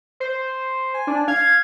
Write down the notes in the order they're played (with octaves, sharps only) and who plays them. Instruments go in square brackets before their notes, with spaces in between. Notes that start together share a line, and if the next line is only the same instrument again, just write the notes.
[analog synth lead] C5
[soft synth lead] G#5
[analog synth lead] D4
[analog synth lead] F5 [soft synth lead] G#6